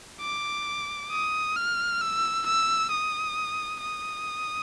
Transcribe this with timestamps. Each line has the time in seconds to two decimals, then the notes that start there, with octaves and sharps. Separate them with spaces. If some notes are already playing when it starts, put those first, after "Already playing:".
0.21 D6
1.11 D#6
1.56 F6
2.01 E6
2.47 E6
2.91 D#6
3.81 D#6